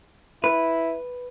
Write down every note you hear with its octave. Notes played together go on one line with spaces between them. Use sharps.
E4 B4